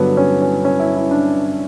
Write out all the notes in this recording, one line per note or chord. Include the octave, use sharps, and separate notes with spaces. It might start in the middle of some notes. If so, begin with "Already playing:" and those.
Already playing: G2 D3 F#3 B3
C#4
C#4
C#4
E4
E4
D4